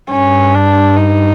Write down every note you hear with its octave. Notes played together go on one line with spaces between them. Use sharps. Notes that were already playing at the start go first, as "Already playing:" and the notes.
G2 C#4
D4
D#4